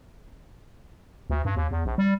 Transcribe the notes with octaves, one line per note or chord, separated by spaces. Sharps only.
D2
G2
D#2
E2
A#1
G3